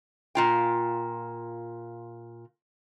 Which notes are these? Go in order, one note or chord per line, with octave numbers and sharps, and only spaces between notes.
A#2 F4 G5